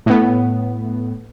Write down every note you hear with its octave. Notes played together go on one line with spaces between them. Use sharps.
A2 B3